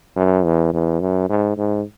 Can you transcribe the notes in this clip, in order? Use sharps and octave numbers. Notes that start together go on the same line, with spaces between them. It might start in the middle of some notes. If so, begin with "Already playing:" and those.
F#2
E2
E2
F#2
G#2
G#2